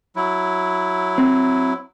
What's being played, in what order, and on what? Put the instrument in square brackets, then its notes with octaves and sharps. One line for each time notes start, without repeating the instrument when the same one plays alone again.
[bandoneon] F#3 E4
[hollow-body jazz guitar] C4